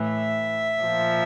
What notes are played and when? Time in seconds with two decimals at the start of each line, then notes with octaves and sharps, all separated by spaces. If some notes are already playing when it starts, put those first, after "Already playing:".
Already playing: A2 E3
0.09 E5
0.81 A#2 F3